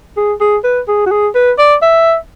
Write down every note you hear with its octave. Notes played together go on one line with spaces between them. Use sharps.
G#4
G#4
B4
G#4
F#4
G#4
B4
D5
E5